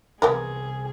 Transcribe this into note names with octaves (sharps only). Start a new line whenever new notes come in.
C2 B3 G4 G#4 A#4